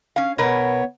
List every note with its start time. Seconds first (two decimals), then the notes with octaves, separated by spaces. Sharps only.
0.16 C#4 F5
0.38 B2 B3 A#4 B4 C#5